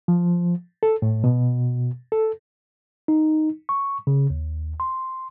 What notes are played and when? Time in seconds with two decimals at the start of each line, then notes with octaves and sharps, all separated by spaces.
0.08 F3
0.83 A4
1.02 A2
1.24 B2
2.12 A4
3.08 D#4
3.69 C#6
4.07 C#3
4.30 D#2
4.80 C6